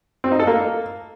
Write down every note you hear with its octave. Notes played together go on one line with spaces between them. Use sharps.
C4
D#4
A4
A#3